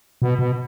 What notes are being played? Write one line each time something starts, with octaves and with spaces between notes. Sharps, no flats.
B2
B2